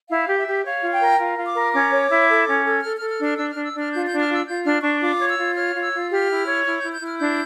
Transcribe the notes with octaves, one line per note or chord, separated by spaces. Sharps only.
E4 F5
G4
E5
G4
C#5 F5
F4
G5
A#4
F4
F4
D6
A#4
C#4 D6
C#5
E4
A4
C#4
A4
A4 F6
A4 F6
F6
D4 F6
D4 E6
D4 F6
E6
D4 F6
F4 G6
D4 G6
F6
F4 E6
F4 G6
D4 F6
D4 C#6
F4 D6
C#5
E6
F4
C#5 F6
F4
E6
F4
G4 F6
E4
C#5
E4 F6
E4 G6
G6
E4 F6
D4 G6